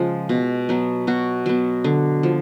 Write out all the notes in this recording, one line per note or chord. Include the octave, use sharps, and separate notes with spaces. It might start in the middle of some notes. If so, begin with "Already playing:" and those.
Already playing: C#3 F3 G#3
B2
F#3 B3
B2 F#4
F#3 B3
D3
F3